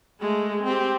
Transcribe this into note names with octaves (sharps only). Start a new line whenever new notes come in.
G#3 A3
C4 G4